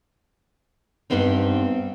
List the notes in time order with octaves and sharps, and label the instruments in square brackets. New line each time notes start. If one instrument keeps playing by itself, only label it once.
[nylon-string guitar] G2 C3 G3 B3 C4 D#4